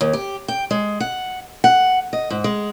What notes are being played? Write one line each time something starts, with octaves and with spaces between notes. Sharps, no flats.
D#2
G4
G5
G#3
F#5
F#5
D#5
G#2
G#3